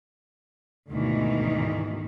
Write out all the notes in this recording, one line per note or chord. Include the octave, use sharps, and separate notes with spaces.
D2 G#2 B2 D#3 E3 G#3